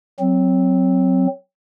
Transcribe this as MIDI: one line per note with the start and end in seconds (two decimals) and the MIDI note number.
0.20 1.27 54
0.20 1.27 60